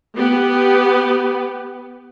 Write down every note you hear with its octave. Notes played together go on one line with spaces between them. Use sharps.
B3 G4